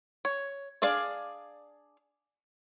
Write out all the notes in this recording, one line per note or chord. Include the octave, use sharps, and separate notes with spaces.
C#5
D4 G#4 D5 F5